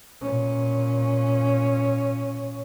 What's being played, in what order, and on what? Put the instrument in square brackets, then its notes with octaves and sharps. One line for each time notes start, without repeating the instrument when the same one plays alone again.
[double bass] A#2 C#4